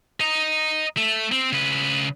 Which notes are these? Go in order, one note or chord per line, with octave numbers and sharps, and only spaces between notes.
D#5 A#5
A3
C4
C#3 B4